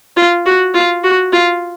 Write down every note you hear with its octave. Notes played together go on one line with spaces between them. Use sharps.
F4
F#4
F4
F#4
F4